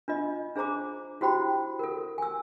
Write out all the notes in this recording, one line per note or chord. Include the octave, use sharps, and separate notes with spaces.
D4 F4 D#5
D4 G#4 C5 A#5 D6
E4 F#4 G4 C5 G5 B5
A4 A#4
G#5 E6